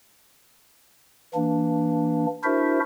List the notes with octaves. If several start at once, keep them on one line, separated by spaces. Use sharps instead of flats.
E3 A#3 D4
D4 E4 F#4 A#4 C5 E5